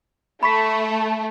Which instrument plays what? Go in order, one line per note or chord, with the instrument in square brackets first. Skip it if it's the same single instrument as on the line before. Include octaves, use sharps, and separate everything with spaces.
[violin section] A3 [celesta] B5 C#6 B6